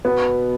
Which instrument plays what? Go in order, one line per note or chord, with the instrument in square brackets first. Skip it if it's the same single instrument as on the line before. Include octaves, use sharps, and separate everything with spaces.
[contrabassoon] B2 [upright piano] B3